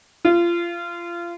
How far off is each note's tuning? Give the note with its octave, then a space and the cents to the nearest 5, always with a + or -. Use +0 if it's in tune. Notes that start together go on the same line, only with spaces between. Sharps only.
F4 -25